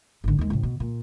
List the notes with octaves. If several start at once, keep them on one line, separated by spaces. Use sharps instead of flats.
G#1 D3
D#2 G#3
A1 C3
B2
A#2